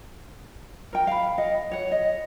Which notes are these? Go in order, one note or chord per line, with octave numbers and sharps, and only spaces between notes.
A#4 G5
F5 B5
D#5 F#5
C#5 F#5
D#5